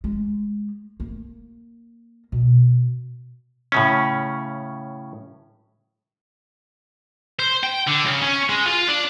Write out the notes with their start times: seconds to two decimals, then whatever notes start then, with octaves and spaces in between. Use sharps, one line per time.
0.04 G#3
1.00 A#3
2.32 B2
3.72 A2 C#3 C#4
7.39 C5
7.63 G5
7.87 D3
8.05 C#3
8.22 C#4
8.49 G#3
8.65 F4
8.88 D4